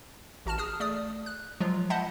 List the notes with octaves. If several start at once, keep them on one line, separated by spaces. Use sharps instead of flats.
A1 F#4 A5 F6 E7
G#4 D#6 F6
A3 D5 D#6
F#6
F3 F#3 G#3 F4
D#5 E5 F#5 A5 B5 G6